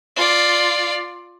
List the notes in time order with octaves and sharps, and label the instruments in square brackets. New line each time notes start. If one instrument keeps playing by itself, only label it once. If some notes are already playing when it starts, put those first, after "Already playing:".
[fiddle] F4 D5